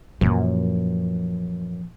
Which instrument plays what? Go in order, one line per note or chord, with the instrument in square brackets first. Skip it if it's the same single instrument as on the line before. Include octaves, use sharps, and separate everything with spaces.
[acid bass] F#2 [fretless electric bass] A#2 [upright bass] E3 F3